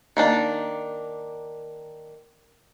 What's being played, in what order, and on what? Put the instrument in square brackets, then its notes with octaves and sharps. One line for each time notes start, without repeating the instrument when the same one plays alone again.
[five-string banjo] D#3 A#3 D4